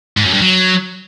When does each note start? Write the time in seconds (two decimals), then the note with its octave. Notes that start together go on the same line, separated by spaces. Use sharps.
0.17 G#2
0.25 F#2
0.33 G2
0.41 F#3